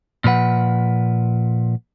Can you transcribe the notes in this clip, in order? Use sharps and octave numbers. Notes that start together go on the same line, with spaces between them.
A#2 F3 B4 F#5